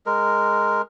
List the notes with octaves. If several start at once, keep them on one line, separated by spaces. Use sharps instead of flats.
G#3 A#4